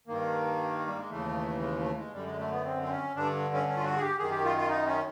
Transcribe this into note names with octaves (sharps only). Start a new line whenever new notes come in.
G2 D#3 A#3
G3
G#3
D#2 C#3 E3 A3
G#3
A3
G#3
F#2 D3 G3
G#3
A3
B3
C4
C4
C#4
G2 D3 D4
C#4
C#4
F4
F#4
G#4
G4
F#2 D#3 G#4
G4
F4
F4
D#4
C#4